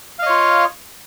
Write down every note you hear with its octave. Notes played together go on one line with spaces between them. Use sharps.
F4 C#5 D#5 F5